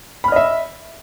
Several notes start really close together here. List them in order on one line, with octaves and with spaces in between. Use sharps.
B5 F6 D#5 E5